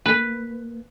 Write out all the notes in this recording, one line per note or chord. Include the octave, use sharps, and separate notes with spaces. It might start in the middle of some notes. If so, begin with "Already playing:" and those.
A#3 B4